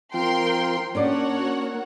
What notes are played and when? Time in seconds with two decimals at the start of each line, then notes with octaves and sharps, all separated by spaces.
0.14 F3 C4 F4 A#4 G5 C6
0.95 A#3 C#4 D4 F#4 C#5 D5 F#5